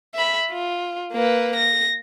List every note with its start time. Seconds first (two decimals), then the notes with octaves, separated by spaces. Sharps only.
0.14 E5 B5
0.51 F4
1.13 A#3 B4
1.56 A#6